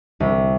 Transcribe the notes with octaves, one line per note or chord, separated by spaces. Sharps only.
C2